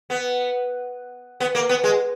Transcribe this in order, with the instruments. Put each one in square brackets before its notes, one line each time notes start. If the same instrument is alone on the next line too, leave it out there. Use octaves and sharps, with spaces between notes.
[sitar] B3
B3
A#3
B3
G#3